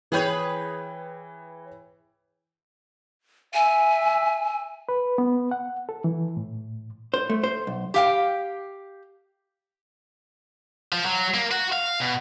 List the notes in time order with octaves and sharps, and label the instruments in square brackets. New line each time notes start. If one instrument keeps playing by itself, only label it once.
[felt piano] E3 G5 G6 [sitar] G#4 B4 C#5
[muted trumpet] E5 [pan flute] G#5
[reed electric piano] B4
B3
F#5
A4
E3
A2
[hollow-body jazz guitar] C5
A3
C5
B1
[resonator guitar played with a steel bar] G4 F5 G5
[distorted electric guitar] F3
F#3
A#3
F#4
F5
B2